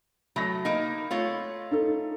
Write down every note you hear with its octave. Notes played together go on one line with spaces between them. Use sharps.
F#3 A3 B5 A#6
A#3 D#4
A3 F4 C#5
D#4 A4